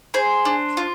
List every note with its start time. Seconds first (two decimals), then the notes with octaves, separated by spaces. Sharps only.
0.14 G#4 C5
0.45 D4
0.77 F4